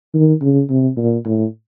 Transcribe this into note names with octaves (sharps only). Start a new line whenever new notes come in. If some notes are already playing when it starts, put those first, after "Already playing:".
D#3
C#3
C3
A#2
A2